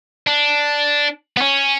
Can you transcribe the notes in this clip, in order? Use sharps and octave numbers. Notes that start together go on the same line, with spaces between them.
D4
B3
C#4